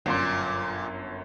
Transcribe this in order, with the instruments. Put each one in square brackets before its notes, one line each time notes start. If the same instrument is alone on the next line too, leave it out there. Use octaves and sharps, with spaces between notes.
[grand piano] G1 F#2 C6 [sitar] A#2